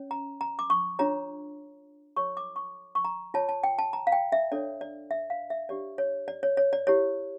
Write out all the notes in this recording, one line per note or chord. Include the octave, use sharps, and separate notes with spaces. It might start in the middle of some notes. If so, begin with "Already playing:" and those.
Already playing: C#4 C#5
A#5
A#5
D6
C#6
D4 F4 C#5 A#5
F4 A4 C#5 C#6
D6
C#6
C#6
A#5
F4 C#5 A5
A5
G5
A5
A#5
F5
G5
E5
D4 A4 C#5 D5
D5
E5
F5
E5
D4 G4 C#5 D5
C#5
D5
C#5
C#5
D5
E4 G4 C#5